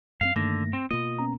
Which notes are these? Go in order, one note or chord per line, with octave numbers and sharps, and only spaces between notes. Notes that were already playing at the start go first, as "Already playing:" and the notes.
F#2 G#3 C4 F5
G2 D3 D#3 A3 A#3 A#6
C4
B2 A#3 F4 D#5
B3 C#4 A#5